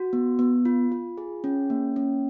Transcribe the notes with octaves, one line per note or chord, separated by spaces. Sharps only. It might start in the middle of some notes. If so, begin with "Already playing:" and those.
Already playing: F#4
B3
B3
F4
F4
G#4
C#4
A#3
C#4